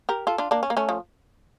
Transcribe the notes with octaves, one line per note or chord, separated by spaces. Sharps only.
G4 A#4
F4 A4
D4 F4
A#3 D4
C#4
A#3
A3 C#4
F3